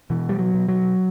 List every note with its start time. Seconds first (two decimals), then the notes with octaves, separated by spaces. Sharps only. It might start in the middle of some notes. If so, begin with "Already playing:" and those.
0.10 B2 E3
0.29 G3
0.39 F#3
0.54 B2
0.68 F#3